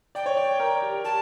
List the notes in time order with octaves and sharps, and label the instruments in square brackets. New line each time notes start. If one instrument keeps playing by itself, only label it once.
[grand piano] D5 [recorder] G5
[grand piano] C#5
D5
A#4
G4
[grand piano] G4 [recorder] A5